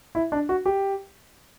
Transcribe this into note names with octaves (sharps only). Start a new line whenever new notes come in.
E4
D4
F#4
G4